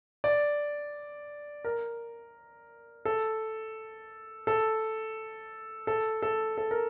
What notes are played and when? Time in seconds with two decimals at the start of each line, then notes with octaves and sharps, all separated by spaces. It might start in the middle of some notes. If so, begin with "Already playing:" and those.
0.24 D5
1.65 A#4
3.05 A4
4.47 A4
5.87 A4
6.22 A4
6.58 A4
6.71 A#4